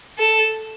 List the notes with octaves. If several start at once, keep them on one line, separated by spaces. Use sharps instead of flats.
A4